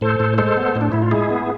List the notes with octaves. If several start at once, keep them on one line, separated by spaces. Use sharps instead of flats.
A2 A4 C5
A2
G#3 A4 C5
B3
A2
D4
A2 E4
F4
G#3 E4 G#4
B3